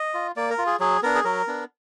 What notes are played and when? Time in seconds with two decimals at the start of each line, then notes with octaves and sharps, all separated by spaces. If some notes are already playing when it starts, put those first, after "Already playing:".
Already playing: D#5
0.14 F4
0.36 A#3 D5
0.50 A#4
0.58 F4
0.66 G#4
0.80 F#3 G#4
1.03 B3 D4 A#4
1.15 G#4
1.24 F#3 A#4
1.47 B3 D4